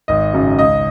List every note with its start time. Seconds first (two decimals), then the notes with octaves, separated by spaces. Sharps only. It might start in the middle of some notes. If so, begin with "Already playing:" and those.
0.08 G#1 D#5
0.33 F#2 C#3 F#3
0.59 C#2 D#5